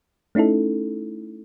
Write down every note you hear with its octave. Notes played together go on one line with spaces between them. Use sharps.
A3 C#4 D#4 E4 A4